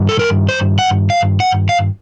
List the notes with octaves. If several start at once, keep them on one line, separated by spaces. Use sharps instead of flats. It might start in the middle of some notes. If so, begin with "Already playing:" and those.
Already playing: G2 D#3
A4
A#4
C5
F#5
F5
F#5
F5